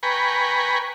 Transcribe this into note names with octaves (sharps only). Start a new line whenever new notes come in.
B4 G5 G#5 A#5 B5 C#6